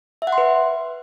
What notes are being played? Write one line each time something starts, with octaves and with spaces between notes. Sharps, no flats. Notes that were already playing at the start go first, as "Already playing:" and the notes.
E5
F#5
C6
B4